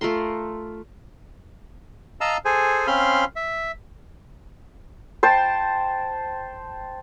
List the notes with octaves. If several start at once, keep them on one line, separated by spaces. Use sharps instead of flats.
A3 F4 A#4 C6
D#5 F5 A5 A#5 E6
G#4 A4 C5 G#5
C4 C#4 F5 B5 C6 F6
E5
C5 G5 A5